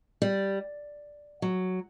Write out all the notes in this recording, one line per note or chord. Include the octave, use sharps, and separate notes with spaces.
G3
F#3